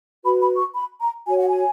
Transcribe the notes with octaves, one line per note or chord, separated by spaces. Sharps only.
F#4 B4 B5
B5
C#6
B5
A#5
F#4 C#5 G#5
F#5
G#5